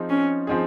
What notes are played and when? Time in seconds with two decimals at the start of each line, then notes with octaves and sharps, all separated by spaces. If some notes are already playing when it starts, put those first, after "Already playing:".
Already playing: F3 C4 D#4 G#4
0.10 C#4
0.47 F3 C4 D#4 G#4